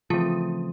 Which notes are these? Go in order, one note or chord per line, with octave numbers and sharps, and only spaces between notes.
C#3 E3 F3 A3 C4 F4